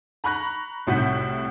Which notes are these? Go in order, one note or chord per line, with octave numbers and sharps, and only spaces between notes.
A#5 B5 C#6 F#6 A#6
C2 A2 F#4 F#5 G6 B6